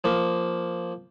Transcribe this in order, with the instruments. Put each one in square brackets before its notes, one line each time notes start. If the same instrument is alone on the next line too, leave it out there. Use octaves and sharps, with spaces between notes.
[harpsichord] F3 A#3